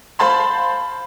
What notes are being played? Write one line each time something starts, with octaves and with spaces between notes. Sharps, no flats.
C5 F5 A5 B5 C6